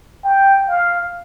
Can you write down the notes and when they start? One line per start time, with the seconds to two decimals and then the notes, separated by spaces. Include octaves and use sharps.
0.24 G5
0.69 F5